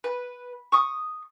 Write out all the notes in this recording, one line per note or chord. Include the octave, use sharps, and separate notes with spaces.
B4
C#6 D#6